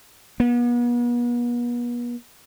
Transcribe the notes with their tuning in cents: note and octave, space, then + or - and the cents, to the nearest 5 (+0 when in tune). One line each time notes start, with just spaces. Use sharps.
B3 -40